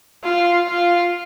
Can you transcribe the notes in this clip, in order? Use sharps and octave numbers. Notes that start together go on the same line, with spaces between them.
F4
F4